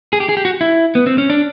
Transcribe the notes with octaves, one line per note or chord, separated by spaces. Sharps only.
G#4
G4
G#4
G4
F#4
E4
B3
C4
C#4
D4